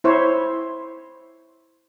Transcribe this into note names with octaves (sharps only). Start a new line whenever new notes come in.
E4 C5 C#5